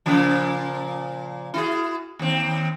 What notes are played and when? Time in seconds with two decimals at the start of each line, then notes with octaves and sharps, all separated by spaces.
0.06 A#2 C#3 F3
1.54 E4 F#4 G#4
2.19 D#2 C4